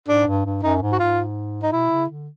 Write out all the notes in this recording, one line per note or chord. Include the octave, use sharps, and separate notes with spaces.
G#2 D4
G2
G2
F#2 D#4
G#2
F#4
G#2 F4
D#4
B2 E4
C#3
D3